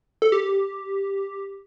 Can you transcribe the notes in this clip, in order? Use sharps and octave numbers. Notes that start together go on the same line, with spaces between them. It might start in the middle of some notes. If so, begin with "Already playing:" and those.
A4
G4